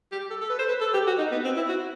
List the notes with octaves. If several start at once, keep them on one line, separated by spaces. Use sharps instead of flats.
G4
A4
A4
B4
C5
B4
A4
G4
F#4
D#4
B3
C4
E4
F#4